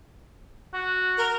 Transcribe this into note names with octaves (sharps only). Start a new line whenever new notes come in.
F#4
A#4